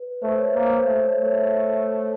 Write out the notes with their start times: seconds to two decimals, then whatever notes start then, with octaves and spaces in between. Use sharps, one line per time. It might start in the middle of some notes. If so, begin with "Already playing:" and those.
Already playing: B4
0.22 A3 C5
0.38 C#5
0.54 A#3 C5
0.69 C5
0.85 A3 C5
1.05 C#5
1.16 A3
1.26 C#5